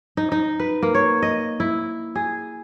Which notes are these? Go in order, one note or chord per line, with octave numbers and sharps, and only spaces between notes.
D#4
D#4
B4
A#3
C#5
D#5
E4
G#4